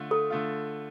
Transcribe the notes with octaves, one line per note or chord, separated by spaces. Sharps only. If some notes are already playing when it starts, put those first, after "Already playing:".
Already playing: D3 A3 F4
A4
D3 A3 F4